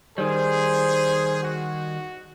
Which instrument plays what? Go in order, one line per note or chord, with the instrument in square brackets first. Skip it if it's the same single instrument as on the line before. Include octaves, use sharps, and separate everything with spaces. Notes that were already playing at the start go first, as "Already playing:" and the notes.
[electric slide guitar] D#3 G3 [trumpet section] G#4 [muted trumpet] C5
[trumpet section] F#4